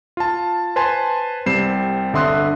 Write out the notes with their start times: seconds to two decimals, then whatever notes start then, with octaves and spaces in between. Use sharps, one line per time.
0.17 F4 A5
0.76 B4 C5 G#5 A5 C6
1.46 C2 G3 C4 C7 E7
2.13 G1 D3 E5 C6 D#6 F#6